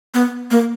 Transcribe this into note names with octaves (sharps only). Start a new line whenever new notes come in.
B3
A#3